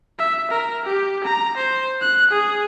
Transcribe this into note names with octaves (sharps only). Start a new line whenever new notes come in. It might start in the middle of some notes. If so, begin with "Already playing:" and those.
E5
A#4
G4
A#5
C5
F#6
G#4